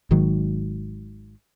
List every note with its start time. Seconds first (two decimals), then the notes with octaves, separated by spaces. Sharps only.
0.11 G#1 G#2 D#3 F#3